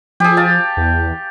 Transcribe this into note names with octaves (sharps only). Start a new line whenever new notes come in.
F3 G4 G#4
F5 A5
E2